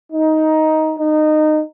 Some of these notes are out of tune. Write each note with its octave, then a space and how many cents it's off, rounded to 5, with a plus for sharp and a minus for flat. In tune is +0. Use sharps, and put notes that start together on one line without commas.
D#4 +10
D#4 -20